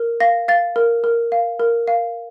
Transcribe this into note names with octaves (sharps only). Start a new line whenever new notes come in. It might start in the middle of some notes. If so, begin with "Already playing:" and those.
Already playing: A#4
F5 A#6
F5 A6
A#4
A#4
F5
A#4
F5